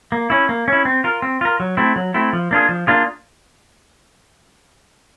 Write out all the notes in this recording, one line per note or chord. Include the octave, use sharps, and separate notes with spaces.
A#3
C#4 E4
A#3
C#4 E4
C4
F4 A#4
C4
F4 A#4
F#3
A3 C4 E4
F#3
A3 C4 E4
F3
A#3 D4 F4 G#4
F3
A#3 D4 F4 G#4